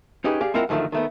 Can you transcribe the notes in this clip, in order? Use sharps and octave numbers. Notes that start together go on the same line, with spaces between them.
C#4 D#4 G4 G#4 B4
G4 G#4 D5 F5
G#3 C4 E4 F4 A#4 F#5
F#2 D3 D#3 F3 A3
D#3 A3 B3